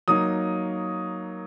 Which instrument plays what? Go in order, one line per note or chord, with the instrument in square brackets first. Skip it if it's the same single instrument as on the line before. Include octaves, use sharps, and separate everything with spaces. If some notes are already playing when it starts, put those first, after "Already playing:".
[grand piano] F#3 A#3 D#4 D#6